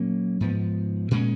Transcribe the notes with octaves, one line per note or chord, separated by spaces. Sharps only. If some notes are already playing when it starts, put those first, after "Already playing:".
Already playing: A#2 F#3 A#3 C#4
G#2 F3 B3
A#2 G#3 C#4